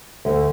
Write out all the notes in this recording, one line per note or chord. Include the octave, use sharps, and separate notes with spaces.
D2